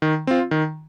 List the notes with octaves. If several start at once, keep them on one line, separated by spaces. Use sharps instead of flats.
D#3
C4 F4
D#3